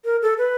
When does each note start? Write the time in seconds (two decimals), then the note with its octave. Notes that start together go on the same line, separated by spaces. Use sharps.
0.05 A#4
0.22 A4
0.38 B4